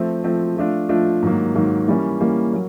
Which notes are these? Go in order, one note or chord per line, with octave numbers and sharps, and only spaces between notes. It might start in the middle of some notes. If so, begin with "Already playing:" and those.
Already playing: F3 A3 C4
F3 A3 C4
F3 A3 D4 F4
F3 A3 D4 F4
G#2 D#3 F#3 A#3
G#2 D#3 F#3 A#3
E3 G3 A#3 C#4
E3 G3 A#3 C#4
F#3 A#3